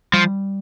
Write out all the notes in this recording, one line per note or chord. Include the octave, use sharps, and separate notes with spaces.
F3 G3